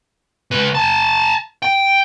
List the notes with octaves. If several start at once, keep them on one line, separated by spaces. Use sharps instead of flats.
C#2 B4
G#5 A5
G5